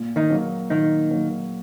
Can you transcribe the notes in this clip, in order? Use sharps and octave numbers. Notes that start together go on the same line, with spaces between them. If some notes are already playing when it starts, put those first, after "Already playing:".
Already playing: A#2
D#3 D#4
F#3 A#3
A#2 D#3 D#4
F#3 A#3